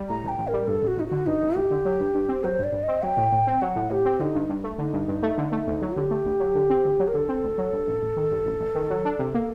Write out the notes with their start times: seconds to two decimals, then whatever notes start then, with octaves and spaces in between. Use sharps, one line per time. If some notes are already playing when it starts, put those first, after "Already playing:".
Already playing: G3
0.09 A2 A#5
0.24 A1 G5
0.38 A1
0.48 A#4
0.53 G3
0.67 G2 A4
0.82 A1
0.87 F#4
0.97 A1 D#4
1.07 D3 F#4
1.26 G2 D#4
1.42 A1
1.55 A1 G4
1.71 D3
1.85 F#3
2.00 G2
2.15 G2
2.29 C4
2.44 F#3 C5
2.59 G2 D5
2.73 G2
2.83 D#5
2.88 C4
3.02 F#3 G5
3.17 A2
3.32 A2
3.47 C4
3.61 F#3 F#5
3.76 A2
3.90 A2 G4
4.05 C4
4.20 D3 D#4
4.35 G2
4.49 G2
4.64 A3
4.78 D3 D#4
4.93 G2
5.08 G2
5.23 A3
5.38 D3
5.52 A3
5.67 D2
5.82 F#3
5.96 D3 G4
6.11 A3
6.25 D2
6.40 F#3
6.55 D3
6.70 C4
6.85 D2
7.00 F#3
7.08 A#4
7.14 D3 A4
7.29 C4
7.44 D2
7.58 F#3
7.73 G2
7.87 A1
8.02 A1
8.16 D#3
8.31 G2
8.46 A1
8.60 A1
8.75 D#3
8.90 F#3
9.05 D4
9.19 C3
9.34 A#3